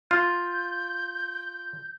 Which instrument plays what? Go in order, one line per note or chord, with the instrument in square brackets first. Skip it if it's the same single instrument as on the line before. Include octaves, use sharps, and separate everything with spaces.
[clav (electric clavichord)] F4 [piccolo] G6